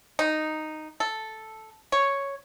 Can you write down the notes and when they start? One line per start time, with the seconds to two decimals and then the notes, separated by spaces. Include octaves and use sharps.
0.19 D#4
1.00 A4
1.92 C#5